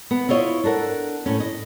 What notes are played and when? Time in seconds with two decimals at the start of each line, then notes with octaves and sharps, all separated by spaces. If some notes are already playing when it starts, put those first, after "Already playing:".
0.11 B3
0.29 E4 F4 C#5 D#5
0.64 D4 A4 A#4 F#5
1.26 A2 C#4
1.40 D#5